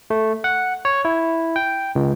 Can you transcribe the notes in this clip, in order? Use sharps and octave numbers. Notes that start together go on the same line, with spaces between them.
A3
F#5
C#5
E4
G5
C#2